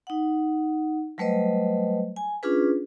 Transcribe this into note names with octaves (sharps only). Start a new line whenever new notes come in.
D#4 F#5
F#3 G3 A3 B4 C5 D#5
G#5
C#4 D4 F4 G#4 B4